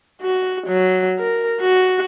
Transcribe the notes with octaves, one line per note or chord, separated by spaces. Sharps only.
F#4
F#3
A#4
F#4